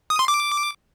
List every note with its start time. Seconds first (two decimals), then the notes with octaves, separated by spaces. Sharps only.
0.10 D#6
0.19 C6
0.28 D6